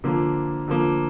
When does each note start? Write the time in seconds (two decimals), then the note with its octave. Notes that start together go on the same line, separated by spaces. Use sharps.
0.04 D3 F3 A#3
0.68 D3 F3 A#3